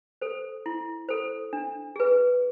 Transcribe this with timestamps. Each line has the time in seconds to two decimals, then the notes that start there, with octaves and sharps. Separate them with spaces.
0.22 A4 C5
0.66 E4
1.09 A4 C5
1.53 D4
1.96 G#4 B4